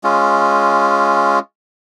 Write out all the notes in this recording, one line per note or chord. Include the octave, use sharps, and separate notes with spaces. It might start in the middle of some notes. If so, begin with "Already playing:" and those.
G#3 C#4 F4